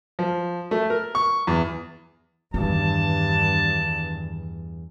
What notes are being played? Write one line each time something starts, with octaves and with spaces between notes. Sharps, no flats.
F3
A3
A#4
C#6
E2
E2 G2 D#3 A5